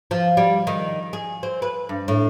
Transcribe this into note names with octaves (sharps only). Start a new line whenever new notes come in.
F3
G3
D#3
G#4
C4
B4
G2
A2